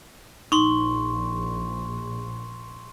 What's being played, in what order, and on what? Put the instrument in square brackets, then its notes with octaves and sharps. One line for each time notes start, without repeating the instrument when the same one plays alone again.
[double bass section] A#1 [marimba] D#4 [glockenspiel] C6 C#6